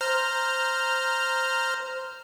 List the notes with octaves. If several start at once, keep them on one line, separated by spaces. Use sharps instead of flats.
C5 A#5 F6